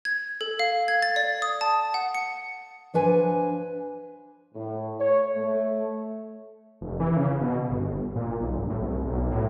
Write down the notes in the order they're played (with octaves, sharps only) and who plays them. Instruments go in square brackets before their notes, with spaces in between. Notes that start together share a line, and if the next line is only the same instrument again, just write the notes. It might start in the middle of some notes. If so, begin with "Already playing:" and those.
[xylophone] G#6
A4
F5
G#6
A6
D5
D#6
A5
F#5
C#7
[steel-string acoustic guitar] F3 D4 B4 G#5
[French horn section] A2
C#5
A3
[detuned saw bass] F1
E3
C#3
B2
G1
A#2
B1
G1
A2
C2
B1
A2